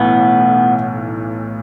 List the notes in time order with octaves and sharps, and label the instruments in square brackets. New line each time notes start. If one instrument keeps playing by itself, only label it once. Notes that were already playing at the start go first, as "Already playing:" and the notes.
Already playing: [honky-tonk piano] B1 A2 E3 [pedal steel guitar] B3